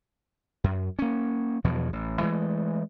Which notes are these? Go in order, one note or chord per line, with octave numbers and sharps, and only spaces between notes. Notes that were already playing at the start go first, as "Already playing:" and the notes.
F#2
A#3 C#4
E2 B2 F3 F#3
A1
E3 G#3 A3